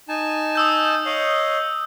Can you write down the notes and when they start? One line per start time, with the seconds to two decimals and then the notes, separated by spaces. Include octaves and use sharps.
0.09 D#4 G#5 A5
0.55 D#6 E6 G6
1.05 C#5 D#5 F5